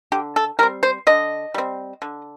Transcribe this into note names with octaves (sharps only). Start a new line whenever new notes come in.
D3 G4
A4
G3 C4 A#4
C5
D3 D#5
G3 C4
D3